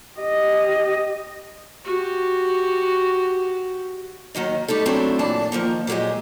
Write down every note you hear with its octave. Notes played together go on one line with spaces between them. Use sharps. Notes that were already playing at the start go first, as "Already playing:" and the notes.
G4 D#5
F#4 G4
D#2 D#3 F#3 D#5
G3 A3 D#4 A4
E2 F#3 A3 C4 D4 E4
F#2 A#2 E3 D4 D5 A5
D#3 F3 A#3 D#4
A#2 F#3 G#3 G4 D#5